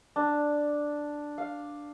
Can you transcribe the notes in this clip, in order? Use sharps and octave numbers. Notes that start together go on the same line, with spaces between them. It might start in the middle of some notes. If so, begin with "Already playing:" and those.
D4
F5